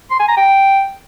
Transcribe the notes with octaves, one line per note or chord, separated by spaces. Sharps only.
C6
G#5
A#5
G5